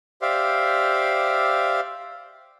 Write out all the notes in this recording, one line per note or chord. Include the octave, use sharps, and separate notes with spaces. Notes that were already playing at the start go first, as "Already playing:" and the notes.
G4 C5 D5 E5 F5